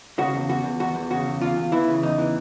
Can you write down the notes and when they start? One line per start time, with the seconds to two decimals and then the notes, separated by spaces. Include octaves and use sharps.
0.18 C#3 F#4
0.34 E2
0.49 E2 F#4
0.64 E2
0.80 E2 F#4
0.95 E2
1.11 C#3 F#4
1.26 E2
1.41 E2 F4
1.56 E2
1.72 E3 E4
1.88 C#3
2.03 E2 D#4
2.19 E3